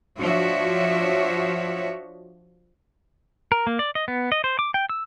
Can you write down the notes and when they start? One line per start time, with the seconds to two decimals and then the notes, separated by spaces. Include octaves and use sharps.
0.19 F3 D4 F#4 C#5 E5
3.52 A#4
3.67 A#3
3.79 D5
3.95 D#5
4.08 B3
4.32 D#5
4.44 C5
4.59 D6
4.74 G5
4.90 E6